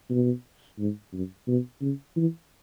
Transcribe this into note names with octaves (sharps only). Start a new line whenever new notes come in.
B2
G#2
F#2
B2
C#3
E3